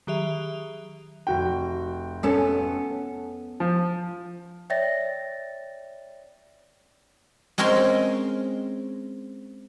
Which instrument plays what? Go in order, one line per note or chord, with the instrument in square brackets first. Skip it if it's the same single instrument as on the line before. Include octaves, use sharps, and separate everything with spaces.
[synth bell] D#3 F#3 G4 G#4 E5 F7
[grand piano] F1 F#4 G5
[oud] B3 C#4 A4
[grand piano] F3
[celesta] C#5 D5 E5 G5 A6 A#6
[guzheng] G#3 C4 C#4 A#4 C6